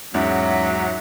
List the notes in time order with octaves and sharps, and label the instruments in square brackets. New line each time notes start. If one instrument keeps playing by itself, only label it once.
[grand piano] E2 G#2 [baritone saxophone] F#3 [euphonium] C#4 [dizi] E5